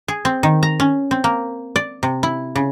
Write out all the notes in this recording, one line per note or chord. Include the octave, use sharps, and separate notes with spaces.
G#4
C4
D#3
A#5
C#4
C4
A#3
D5
C3
E4
C#3